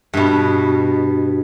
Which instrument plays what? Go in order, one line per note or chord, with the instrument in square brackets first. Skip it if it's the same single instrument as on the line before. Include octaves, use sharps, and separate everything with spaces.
[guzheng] G2 B2